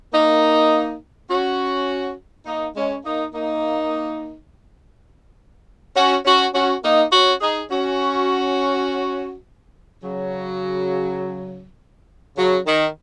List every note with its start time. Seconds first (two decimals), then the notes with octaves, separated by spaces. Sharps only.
0.13 A#3 D#4
1.30 C#4 F#4
2.46 A#3 D#4
2.75 G#3 C#4
3.05 A#3 D#4
3.33 A#3 D#4
5.96 C#4 F#4
6.25 C#4 F#4
6.54 C#4 F#4
6.83 A#3 D#4
7.12 C#4 F#4
7.41 D#4 G#4
7.71 C#4 F#4
10.03 C#3 F#3
12.37 C#3 F#3
12.66 D#3